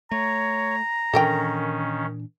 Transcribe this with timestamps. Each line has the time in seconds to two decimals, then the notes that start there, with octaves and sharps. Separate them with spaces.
0.12 A3 C#5 A#5
1.14 A#2 D#3 E3 C#4 D4 A4 A#4 G5